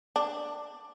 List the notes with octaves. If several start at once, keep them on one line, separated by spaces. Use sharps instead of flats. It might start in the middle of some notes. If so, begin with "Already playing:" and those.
D4